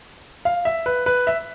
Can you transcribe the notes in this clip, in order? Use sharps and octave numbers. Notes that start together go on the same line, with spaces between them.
F5
E5
B4
B4
E5